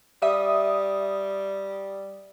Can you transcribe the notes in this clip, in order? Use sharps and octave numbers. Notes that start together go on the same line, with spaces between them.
G3 E5 D#6